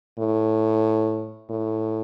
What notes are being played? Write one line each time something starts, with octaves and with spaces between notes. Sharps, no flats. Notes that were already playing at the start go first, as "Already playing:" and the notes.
A2
A2